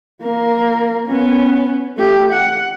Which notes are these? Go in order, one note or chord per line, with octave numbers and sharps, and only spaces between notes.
A#3 A#4
B3 C#4
A3 G4
F#5